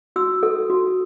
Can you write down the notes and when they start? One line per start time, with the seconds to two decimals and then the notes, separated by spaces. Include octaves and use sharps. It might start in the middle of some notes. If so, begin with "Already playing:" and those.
0.16 F#4 E6
0.43 A4
0.70 F#4